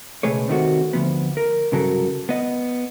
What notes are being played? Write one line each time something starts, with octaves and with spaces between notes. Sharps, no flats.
C#2 B2 A3 G#4 B4 C#5
C3 D#3 A3 F#4
D2 F3 B3
A#4
C2 G2 C#3 F#3 A4 A#4
B3 D#5